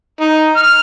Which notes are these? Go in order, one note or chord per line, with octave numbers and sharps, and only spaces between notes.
D#4
F6